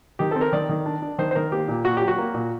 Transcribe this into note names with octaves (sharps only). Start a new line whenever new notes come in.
D#3 G4
C4 A4
A#4
D#3 D5
D#3
D4
D4
D#3 C5
C5
D#3 A#4
A#3 G4
A#2
A#2 F#4
F#3 G4
F#4
A#3
A#2